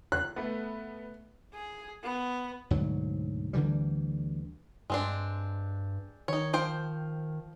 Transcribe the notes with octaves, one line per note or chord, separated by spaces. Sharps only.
F#6
A3 B3
G#4
B3
D2 G#2 B2 F#3
D2 D3 E3 G3
G2 G#3 C4 D4
D#3 D#4 C#5
F3 C5 G5